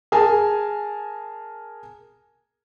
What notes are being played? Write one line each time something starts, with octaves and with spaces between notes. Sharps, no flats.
G#4 A#4 G#5 A5